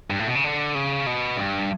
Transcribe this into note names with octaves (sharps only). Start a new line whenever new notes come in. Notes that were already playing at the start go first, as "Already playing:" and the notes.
G2
A2
B2
C#3
D3
C#3
B2
G2